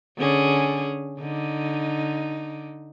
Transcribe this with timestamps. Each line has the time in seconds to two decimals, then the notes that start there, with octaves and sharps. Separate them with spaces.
0.18 D3 C#4 G#4
1.20 D3 D#4